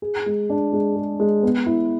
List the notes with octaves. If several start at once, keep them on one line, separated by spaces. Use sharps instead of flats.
G#4
G#3
D4
G#3
G#4
G#3
B3
E4